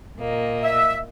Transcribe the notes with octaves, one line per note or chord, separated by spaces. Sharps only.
A#2 A#3 D#5
E5